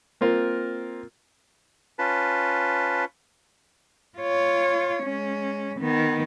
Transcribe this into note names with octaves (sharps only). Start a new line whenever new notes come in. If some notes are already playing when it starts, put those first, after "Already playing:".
A#3 C4 F4 A#4
C#4 F4 B4 A5
F4 C#5
G#3 C#4
D#3 B3